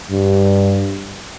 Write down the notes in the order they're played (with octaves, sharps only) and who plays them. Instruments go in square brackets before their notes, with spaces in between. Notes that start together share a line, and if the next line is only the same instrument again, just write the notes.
[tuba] G2